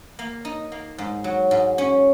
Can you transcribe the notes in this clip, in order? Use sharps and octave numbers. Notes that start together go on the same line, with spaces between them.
A#3
D#4
A#3
G#2
F#3
G#2
C#4